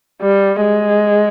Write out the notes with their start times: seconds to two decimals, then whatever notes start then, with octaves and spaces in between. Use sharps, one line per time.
0.22 G3
0.61 G#3